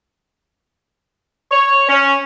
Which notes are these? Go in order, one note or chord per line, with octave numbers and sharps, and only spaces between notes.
C#5
C#4